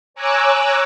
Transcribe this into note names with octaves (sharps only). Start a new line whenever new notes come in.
C#5 G#5 A#5 D6 E6 F#6